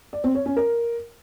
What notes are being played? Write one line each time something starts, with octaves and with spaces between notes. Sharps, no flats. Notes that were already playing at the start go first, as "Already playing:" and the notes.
D5
C4
C#5
C#4
A#4